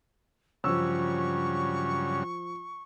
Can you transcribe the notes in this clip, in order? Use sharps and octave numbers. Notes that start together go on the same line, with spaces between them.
G2 C#3 F3 F#3 C#6 E6